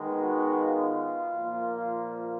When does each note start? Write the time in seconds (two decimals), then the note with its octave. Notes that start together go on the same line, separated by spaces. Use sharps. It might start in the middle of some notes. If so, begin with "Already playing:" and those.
Already playing: D#3 G#3 B3
0.19 F#4
0.58 F4
1.35 A#2 F3 A#3